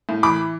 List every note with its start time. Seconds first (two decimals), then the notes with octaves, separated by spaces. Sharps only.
0.09 A2
0.23 E3 B5 D6